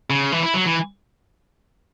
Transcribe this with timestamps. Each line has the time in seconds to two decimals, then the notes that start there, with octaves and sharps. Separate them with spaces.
0.10 C#3
0.32 E3
0.43 E4
0.54 F#3
0.66 E3